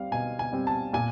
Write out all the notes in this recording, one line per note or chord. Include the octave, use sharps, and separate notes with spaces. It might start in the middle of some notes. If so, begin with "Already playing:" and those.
Already playing: G3 C4 F5
B2 G#5
G#5
G3 C4
A5
A#2 G#5